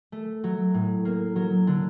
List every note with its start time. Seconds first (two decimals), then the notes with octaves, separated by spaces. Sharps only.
0.12 A3
0.44 F#3
0.74 A2
1.05 A#3
1.36 F#3
1.67 D3